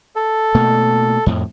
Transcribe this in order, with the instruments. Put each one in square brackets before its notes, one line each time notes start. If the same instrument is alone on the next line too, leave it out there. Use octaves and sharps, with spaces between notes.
[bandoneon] A4
[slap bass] B2 A3 A#3
F2 A2